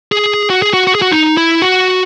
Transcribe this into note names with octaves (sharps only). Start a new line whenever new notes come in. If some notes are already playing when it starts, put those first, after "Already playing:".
G#4
F#4
G#4
F#4
F#4
G#4
F#4
D#4
E4
F#4